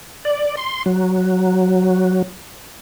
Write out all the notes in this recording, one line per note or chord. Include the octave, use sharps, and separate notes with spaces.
D5
C6
F#3